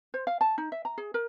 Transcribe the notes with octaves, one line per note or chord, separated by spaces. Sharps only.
C5
F5
A5
D#4
E5
A#5
G#4
A#4